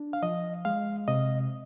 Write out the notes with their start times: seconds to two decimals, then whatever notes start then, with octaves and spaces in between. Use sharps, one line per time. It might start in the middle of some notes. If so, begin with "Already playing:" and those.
Already playing: D4
0.13 F5
0.23 F3 D#5
0.65 G#3 F5
1.08 C3 D#5